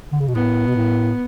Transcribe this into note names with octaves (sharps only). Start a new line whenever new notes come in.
D3
C#3
B2
A2 B3
B2
A2